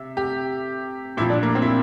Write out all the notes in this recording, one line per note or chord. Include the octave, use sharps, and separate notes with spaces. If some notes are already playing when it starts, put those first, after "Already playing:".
Already playing: C3 E5
G4
A#2 F3 E4
D4
A#3
C4
E4